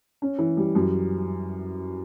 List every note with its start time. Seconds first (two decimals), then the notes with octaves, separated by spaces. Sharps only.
0.22 C#4
0.39 E3
0.57 G3
0.75 F#2